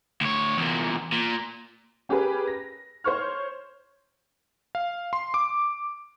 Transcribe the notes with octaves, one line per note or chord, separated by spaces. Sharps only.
D2 C#5
E2 A#2
A#2
C#4 G4 G#4 A#4 B4
A#6
C5 C#5 C#6 F6
F5
C6
D6